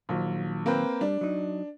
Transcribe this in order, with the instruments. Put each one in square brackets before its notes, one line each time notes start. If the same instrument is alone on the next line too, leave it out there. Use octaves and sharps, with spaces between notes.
[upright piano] A#1 [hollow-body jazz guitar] A#2 D#3 F#3
[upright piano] A#3 C4 B4
[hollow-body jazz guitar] G3 [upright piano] D4
[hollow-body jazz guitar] F#3 D#4